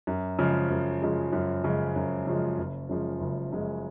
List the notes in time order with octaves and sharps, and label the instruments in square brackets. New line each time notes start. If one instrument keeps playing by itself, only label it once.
[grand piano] F#2
C#3 F3 G#3
F#2
C#3 F3 G#3
F#2
C#3 F3 G#3
F#2
C#3 F3 G#3
F#1
F#2 C#3 F3 G#3
F#1
F#2 C#3 F3 G#3